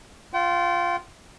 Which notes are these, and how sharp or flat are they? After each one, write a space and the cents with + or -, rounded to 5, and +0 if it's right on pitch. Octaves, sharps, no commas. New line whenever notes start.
F4 +0 G5 -40